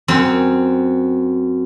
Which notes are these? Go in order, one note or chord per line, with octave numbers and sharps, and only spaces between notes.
F#2 C4